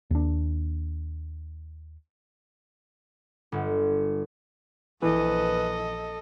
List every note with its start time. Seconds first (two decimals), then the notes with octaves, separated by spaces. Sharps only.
0.11 D#2 D4
3.52 G1
5.02 A#1 E3 A4 B4 D#5